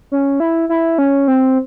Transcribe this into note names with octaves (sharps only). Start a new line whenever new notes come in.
C#4
E4
E4
C#4
C4